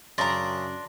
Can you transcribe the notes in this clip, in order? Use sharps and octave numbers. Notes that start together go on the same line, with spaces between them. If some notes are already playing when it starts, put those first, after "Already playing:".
F#2 C#3 D4 A#5 C6 A#6